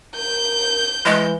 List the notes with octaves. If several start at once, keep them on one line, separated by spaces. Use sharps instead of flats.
A#4 G6
E3 G#3